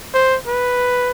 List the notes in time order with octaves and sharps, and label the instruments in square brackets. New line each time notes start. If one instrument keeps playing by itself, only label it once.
[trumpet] C5
B4